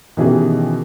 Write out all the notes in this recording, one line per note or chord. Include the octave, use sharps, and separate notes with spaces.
B2 D#3 E3 C#4 G4 G#4